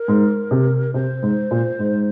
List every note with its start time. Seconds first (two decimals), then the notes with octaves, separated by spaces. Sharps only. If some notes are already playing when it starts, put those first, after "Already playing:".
Already playing: A#4
0.08 G#2
0.51 C3
0.94 C3 C5
1.23 G#2
1.51 A#2
1.79 G#2